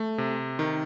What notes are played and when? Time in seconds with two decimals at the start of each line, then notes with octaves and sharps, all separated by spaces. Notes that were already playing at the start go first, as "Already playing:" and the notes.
Already playing: A3
0.18 C3
0.59 D#3